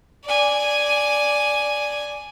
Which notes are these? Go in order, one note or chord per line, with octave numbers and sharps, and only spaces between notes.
D5 G#5